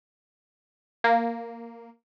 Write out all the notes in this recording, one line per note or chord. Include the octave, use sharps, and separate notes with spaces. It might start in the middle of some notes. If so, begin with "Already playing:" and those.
A#3